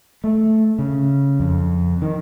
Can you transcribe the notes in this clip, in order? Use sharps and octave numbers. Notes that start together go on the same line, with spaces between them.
A3
C#3
F2
D#3